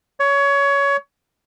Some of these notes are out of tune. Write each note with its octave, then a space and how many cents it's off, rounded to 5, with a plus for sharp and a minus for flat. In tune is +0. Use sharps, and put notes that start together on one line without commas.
C#5 +20